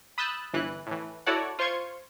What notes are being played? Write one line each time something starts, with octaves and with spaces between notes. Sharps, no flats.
B5 D#6 E6 F#6 G6 A6
G1 E3 F#6
A2 E3
E4 F#4 A4 C#5 D5 F#5
F4 C5 C6 C#6 G#6